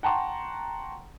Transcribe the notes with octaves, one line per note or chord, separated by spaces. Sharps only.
F#5 G5 A5 A#5 C6 C#6